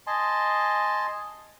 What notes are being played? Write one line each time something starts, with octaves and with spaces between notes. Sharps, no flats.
D#5 G#5 A5 C6